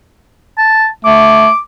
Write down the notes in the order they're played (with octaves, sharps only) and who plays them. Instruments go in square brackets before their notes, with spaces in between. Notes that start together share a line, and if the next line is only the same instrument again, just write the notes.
[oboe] A5
[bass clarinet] A3 [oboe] D6